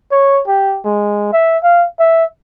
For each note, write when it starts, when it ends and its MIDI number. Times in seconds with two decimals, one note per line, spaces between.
0.12 0.41 73
0.47 0.80 67
0.85 1.29 56
1.33 1.58 76
1.63 1.86 77
2.00 2.25 76